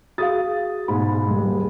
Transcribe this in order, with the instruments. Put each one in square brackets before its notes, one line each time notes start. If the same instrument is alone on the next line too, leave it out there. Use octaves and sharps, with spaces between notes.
[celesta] F#4 G#4 F5 [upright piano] D#6 A6
[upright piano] G#2 B2 G#3 [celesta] B5
[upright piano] D#1 G#3